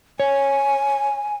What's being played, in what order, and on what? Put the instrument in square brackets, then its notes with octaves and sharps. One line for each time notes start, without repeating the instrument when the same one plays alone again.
[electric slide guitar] C#5 [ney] G#5